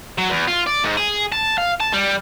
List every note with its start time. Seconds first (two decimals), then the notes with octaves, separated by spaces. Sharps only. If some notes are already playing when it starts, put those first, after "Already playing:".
0.18 F#3
0.30 E2
0.48 F4
0.67 D5
0.84 G#2
0.97 G#4
1.32 A5
1.58 F5
1.80 A5
1.93 G3